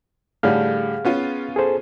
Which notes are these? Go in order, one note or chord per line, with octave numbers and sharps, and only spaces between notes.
A2 D3 G3 G#4 F5 F6
B3 C#4 F4
G#4 A4 C5